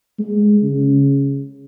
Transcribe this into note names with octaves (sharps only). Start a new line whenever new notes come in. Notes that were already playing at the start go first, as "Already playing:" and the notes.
G#3
C#3